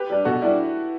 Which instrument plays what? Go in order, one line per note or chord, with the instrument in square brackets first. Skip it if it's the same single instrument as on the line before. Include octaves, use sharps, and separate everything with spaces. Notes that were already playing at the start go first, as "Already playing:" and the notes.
Already playing: [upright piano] G4 B4
[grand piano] G3 D4
[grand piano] B2 [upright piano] F#4 A4
[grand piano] G3 D4 [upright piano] E4 G4